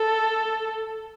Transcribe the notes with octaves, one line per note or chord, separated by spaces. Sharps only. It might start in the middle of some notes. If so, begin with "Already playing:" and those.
Already playing: A4